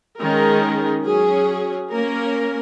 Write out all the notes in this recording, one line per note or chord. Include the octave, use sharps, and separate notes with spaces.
D#3 G#3 C#4 A#4
F#3 C#4 G#4
A#3 C#4 A#4